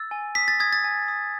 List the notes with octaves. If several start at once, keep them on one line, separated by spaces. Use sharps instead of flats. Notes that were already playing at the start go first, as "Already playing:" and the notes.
Already playing: E6 A6
G#5
D#6 B6
A6
D#6 G#6
A6
G#5
D#6